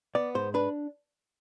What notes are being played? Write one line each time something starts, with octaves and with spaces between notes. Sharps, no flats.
B3 D5
G#2 C5
D4 B4